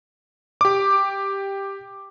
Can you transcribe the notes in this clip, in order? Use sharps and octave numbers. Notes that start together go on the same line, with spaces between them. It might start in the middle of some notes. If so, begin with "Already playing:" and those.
G4 D6